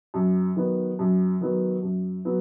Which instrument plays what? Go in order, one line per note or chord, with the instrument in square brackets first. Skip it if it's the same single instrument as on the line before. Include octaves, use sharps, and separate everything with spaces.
[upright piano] F#2
D#3 F#3 B3
F#2
D#3 F#3 B3
F#2
F#3 B3